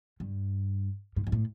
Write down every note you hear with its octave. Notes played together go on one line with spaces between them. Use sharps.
G2
G#2
G#2
A2